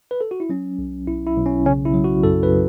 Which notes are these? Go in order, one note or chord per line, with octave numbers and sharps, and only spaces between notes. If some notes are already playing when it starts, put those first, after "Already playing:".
B4
A4
F#4
E4
F#3 C#4
B1
B1 E4
E4
B1
C#4
C#3 C#4
E4
F#3
F#4
F#2 A4
B4
F#3